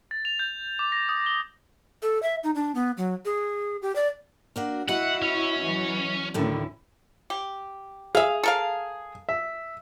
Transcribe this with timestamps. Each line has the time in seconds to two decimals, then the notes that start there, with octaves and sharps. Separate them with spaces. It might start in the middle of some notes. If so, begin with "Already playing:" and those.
0.11 A6
0.25 F7
0.39 G6
0.79 D6
0.92 A#6
1.09 D#6
1.26 G7
2.02 A4
2.22 E5
2.43 D#4
2.55 D4
2.75 B3
2.97 F#3
3.25 G#4
3.82 G4
3.96 D5
4.56 A#3 D4 F#4
4.88 E4 F#4 D#5 E5 F#5
5.22 C#4
5.62 E3 F#3
6.34 D2 A2 D3 D#3 C#4 E4
7.30 G4
8.15 G#4 E5 F5
8.43 A4 A#4 F5
9.29 E5